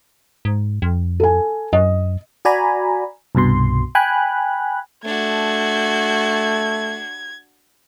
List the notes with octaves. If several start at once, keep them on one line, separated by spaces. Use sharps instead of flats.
G#2
F2
A4 G#5
F#2 D#5
F#4 D5 G#5 A#5 B5
C2 G2 B2 C6
G5 G#5 B5 F#6
A3 D4 F#4 G#6